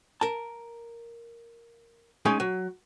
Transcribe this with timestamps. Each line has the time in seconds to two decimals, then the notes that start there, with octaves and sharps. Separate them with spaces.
0.21 A#4 A5
2.25 G#3 C#4 D#4 G#4
2.40 F#3